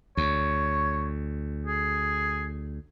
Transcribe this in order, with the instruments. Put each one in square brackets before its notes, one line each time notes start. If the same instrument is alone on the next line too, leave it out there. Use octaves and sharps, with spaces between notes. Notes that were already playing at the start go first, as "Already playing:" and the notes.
[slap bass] D2 [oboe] C#5
[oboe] G#4